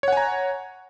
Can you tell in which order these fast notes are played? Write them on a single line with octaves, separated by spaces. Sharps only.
C#5 F#5 G#5 A#5